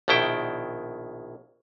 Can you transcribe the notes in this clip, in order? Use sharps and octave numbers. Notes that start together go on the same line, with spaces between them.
A#1 B2 D#3 E4 G5